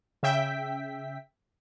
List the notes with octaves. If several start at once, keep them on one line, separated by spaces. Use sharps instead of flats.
C#3 E5 G5 B6